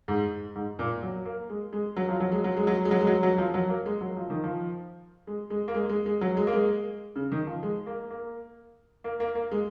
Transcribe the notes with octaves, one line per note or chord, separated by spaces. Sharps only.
G#2
G#2
A#2
F#3
A#3
G#3
G#3
F#3
F3
F#3
G#3
F#3
G#3
F#3
G#3
F#3
G#3
F#3
F#3
F3
F#3
A#3
G#3
F#3
F3
D#3
F3
G#3
G#3
A#3
G#3
G#3
G#3
F#3
G#3
A#3
G#3
C#3
D#3
F3
G#3
A#3
A#3
A#3
A#3
A#3
G#3